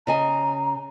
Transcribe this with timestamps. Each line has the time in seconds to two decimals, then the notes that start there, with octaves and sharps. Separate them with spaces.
0.07 C#3 D#5 G#5 A#5